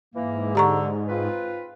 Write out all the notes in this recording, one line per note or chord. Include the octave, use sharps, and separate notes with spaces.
G#2 E3 A#3
D3 G4 A#5 C#6
C4 F4 B4